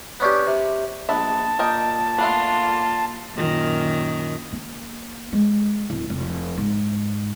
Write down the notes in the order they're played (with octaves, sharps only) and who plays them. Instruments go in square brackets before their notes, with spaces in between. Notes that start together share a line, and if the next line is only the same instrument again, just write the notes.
[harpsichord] B3 C#4 D4 G4
C3
[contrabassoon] A#1 [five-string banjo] G#3 B3 E5 [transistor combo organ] A5
[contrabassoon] A#2 [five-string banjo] A#4 D#5 G5
[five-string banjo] A3 B3 D4 [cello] F4
[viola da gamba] F#2 A#2 D#3
[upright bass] A#3
G#3
D1
F1
G#2